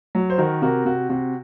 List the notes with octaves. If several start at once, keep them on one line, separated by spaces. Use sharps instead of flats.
F#3
C5
D#3 F#4 A#4
C3 F#4 A#4
C3 F#4
C3 F#4